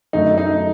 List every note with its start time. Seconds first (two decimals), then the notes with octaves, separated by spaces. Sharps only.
0.13 F#2 D3 F#3 A3 D4 D#4
0.38 D#4